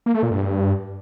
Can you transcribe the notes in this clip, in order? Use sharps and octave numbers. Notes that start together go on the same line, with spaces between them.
A#3
A3
A#2
G2